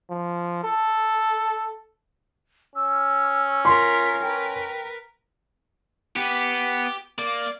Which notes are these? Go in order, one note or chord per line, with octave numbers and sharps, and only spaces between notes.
F3
A4
C#4 E6
F4 A#4 C6 B6
A#4 B4 G5
B3 G4
A#3 D5